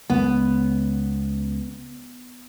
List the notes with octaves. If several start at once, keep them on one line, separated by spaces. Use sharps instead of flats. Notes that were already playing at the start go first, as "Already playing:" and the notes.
C#2 B3